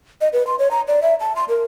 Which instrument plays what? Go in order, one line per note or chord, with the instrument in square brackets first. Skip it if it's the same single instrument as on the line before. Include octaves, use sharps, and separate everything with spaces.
[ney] D#5
B4
C6
C#5
A#5
D5
E5
A5
C6
A#4